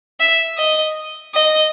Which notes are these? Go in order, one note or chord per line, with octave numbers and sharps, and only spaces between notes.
E5
D#5
D#5